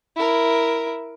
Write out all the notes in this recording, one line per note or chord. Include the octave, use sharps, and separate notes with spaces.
E4 A#4